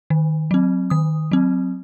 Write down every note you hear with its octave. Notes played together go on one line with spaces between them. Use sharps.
D#3
F#3 C4
D#3 D#6
F#3 C4